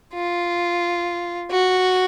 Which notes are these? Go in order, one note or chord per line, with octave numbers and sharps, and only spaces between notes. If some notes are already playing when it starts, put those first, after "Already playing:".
F4
F#4